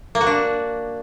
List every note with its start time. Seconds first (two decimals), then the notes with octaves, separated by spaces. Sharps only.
0.15 A#3
0.21 F#4
0.27 D4